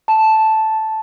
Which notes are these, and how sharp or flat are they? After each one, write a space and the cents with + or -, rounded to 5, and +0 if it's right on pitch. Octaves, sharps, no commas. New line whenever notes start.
A5 -5